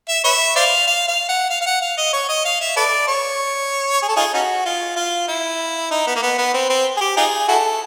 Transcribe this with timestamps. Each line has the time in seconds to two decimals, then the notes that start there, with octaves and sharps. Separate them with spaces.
0.08 E5
0.24 B4 C#5 E5
0.56 C5 D5 F5
0.87 F5
1.08 F5
1.29 F#5
1.50 F5
1.61 F5
1.66 F#5
1.81 F5
1.97 D#5
2.13 C#5
2.29 D#5
2.45 F5
2.61 E5
2.76 A4 B4 D5
3.08 C#5
4.02 G#4
4.08 A4
4.16 D#4 F4 G#4
4.34 C#4 D#4 F#4
4.65 F4
4.96 F4
5.28 E4
5.91 D#4
6.07 B3
6.16 A#3
6.23 B3
6.38 B3
6.54 C4
6.69 C4
6.97 G#4
7.01 G4
7.17 D#4 F4 G#4
7.48 E4 F#4 A4